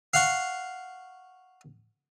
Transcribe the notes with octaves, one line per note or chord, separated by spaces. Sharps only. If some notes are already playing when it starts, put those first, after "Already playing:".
F5 F#5 C#6